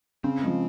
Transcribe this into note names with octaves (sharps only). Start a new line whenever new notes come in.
C#3 C4
F3 G#3